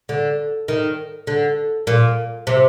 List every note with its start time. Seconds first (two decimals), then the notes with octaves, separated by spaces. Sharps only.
0.09 D3
0.68 D#3
1.27 D3
1.87 A#2
2.47 C3